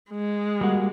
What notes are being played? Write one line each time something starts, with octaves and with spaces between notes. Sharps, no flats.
G#3
G3 A#3 F#4